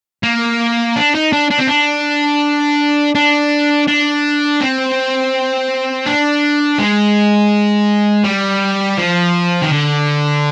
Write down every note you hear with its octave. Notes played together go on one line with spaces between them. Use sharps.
A#3
D4
D#4
D4
D4
C4
D4
D4
D4
C4
D4
G#3
G3
F3
D#3
D3